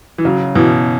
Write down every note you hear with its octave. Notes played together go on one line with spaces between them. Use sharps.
E3
C#3 F#3
B2 E3